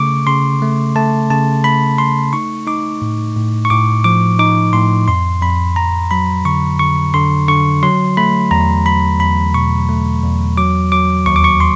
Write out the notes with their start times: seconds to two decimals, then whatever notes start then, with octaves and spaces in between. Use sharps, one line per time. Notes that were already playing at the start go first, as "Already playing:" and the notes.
Already playing: C#3 A3 C#6 D6
0.27 C#3 C6
0.62 A3
0.96 A3 A5
1.30 C#3 A5
1.64 A3 B5
1.98 A3 C6
2.33 D#4 C#6
2.67 D#4 D6
3.02 A2
3.37 A2
3.65 C#6
3.70 A2 D6
4.04 F3 D6
4.39 D#4 D6
4.73 A2 C6
5.08 F2 C6
5.42 F2 B5
5.76 F2 A#5
6.11 F#3 B5
6.45 D3 C#6
6.79 D3 C#6
7.14 D3 C6
7.48 D3 C#6
7.83 F#3 C6
8.17 A3 B5
8.51 E2 A#5
8.85 F#3 B5
9.19 E2 B5
9.54 B2 C#6
9.89 A3
10.23 E2
10.57 F#3 D6
10.92 F#3 D6
11.26 D#2 C#6
11.36 D6
11.44 C#6
11.60 C6